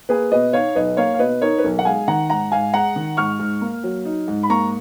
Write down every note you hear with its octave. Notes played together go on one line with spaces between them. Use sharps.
A#3 G#4 B4
B2 B4 D#5
D#4 C#5 F5
B1 B4 D#5
A#3 C#5 F5
F5
B2 B4 D#5
D#4 A#4 C#5
B4
B1 A#4
F#5
G#3 F5 G#5
D#3 F#5 A#5
G#2 F#5 A#5
G#2 F5 G#5
G#3 F#5 A#5
D#3
G#2 C#6 F6
G#2
A#3
F#3
D#4
G#2
B5
A#3 A#5 C#6